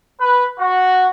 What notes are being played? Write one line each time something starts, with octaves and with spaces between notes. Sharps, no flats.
B4
F#4